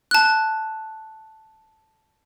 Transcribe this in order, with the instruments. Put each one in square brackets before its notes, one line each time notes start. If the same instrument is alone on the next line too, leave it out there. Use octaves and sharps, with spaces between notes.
[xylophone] A5 F#6